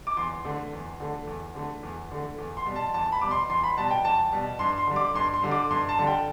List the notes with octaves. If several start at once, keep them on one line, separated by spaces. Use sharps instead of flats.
D6
E2 C6
D3 A3
E2
D3 A3
E2
D3 A3
E2
D3 A3
E2
C6
B2 G3
A5
E2 A5
B5
B2 G3 D6
C6
E2 C6
B5
B2 G3 A5
G5
E2 A5
B2 G3
G2 C6
C6
D3 G3
D6
G2 C6
C6
D3 G3
D6
G2 C6
A5
D3 G3
G5